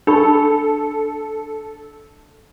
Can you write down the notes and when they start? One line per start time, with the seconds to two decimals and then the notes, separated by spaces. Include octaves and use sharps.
0.07 D4 A4 B5 C#6